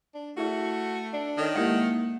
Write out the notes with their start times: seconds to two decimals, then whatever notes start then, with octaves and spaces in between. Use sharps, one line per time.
0.15 D4
0.37 A3 E4 F#4 G#4 E5
1.13 D4
1.37 D#3 A4 C#5 D#5
1.56 G#3 A#3 E4 G4 A#4 E5 F#5